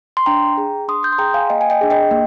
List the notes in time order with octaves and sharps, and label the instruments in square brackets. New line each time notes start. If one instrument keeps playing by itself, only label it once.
[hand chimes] C6
D4 G5 A#5
G#4
D4 C6 D#6
D#6 G6
C6
G#4 G5 A#5
F5 G#5
A#3 D#5 G5
G#5
D#5 G5
D4 G#4
D#5 G5
A#3